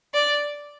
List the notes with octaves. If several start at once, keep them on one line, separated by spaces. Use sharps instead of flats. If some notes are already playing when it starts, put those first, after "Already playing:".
D5